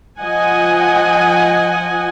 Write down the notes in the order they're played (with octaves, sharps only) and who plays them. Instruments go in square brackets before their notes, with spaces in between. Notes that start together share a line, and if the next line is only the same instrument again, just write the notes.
[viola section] F3 D#5 F#5 G#5